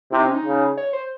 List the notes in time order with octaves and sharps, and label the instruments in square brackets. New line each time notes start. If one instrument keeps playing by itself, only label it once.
[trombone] C3 [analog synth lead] E4
[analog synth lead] D#4
C#4
D#4
[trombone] C#3
[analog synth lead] C#5
C5